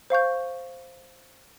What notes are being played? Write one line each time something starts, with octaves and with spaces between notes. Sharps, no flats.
C5 F5 C#6 G6